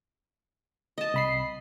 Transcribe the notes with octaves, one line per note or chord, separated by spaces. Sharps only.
D#5 A5
C2 B5 C7